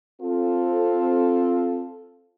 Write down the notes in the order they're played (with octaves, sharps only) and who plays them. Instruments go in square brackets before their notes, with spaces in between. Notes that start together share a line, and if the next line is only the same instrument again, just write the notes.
[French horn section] C4 F4 A4